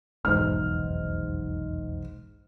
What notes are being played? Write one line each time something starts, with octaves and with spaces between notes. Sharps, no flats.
F1 B1 E2 G#2 F6